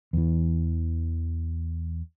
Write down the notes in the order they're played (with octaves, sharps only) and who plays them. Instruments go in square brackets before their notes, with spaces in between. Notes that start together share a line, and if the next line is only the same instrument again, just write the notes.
[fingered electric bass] E2 E3